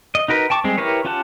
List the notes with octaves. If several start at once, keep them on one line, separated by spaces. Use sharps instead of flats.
D#5
D#4 F#4 A#4 B4
G5 A5 C#6 D6
G3 G#3 C4 G#4
E4 G4 A#4 B4 C#5
C#4 F4 G4 F#5 A5